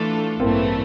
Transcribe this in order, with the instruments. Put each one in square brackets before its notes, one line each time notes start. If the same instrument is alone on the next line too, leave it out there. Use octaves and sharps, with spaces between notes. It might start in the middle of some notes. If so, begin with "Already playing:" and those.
Already playing: [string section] E3 A3 D4 F4 A4
[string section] A1 G2 E3 A3 [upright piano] A#3 C4